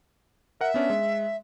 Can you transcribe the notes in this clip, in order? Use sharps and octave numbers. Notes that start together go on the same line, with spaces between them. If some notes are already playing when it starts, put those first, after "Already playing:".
A#4 E5 F#5
B3 C#4 D4
G#3